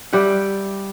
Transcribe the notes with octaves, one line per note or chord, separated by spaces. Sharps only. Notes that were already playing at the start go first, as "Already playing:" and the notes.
G3 G4 E5 F#5